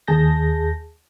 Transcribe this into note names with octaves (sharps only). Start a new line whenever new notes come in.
D#2 G#4 A5 G6 A#6